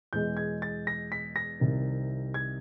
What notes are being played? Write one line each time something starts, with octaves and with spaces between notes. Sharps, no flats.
E2 B2 G#3 G6
G#6
A6
A#6
B6
A#6
C2 C3 D#3
G#6